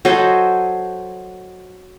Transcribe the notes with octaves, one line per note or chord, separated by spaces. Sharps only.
F#3 A4 C5 D#5